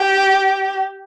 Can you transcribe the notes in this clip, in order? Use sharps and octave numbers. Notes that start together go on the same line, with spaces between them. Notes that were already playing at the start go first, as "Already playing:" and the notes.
Already playing: G4